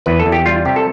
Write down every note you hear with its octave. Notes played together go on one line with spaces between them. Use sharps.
E2 B4
A4
E2
G4
G3 F4
C3 G4
A4